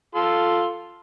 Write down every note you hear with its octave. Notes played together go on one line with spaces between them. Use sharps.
F4 A4 C6